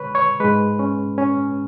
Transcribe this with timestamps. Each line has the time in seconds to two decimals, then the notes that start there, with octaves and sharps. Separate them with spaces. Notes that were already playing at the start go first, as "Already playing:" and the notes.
Already playing: D3 G#3 B4 C#5
0.15 C#5
0.40 G#2 G#3 B4
0.79 C#4
1.18 C#4